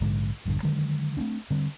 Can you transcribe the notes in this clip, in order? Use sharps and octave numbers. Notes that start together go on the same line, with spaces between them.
A#1 G#2 D3 G#3
D#1 A#1 G2 D3
D3 D#3 F#3 G#3
A3 B3 C4 D4
D3 G3 C4